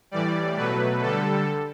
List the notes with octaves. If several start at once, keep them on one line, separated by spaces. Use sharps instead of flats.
A2 E3 G3 D5
B2 F#3 A3 B4
D3 G3 A4